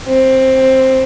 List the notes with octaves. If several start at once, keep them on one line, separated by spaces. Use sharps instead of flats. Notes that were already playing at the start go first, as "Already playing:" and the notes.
C4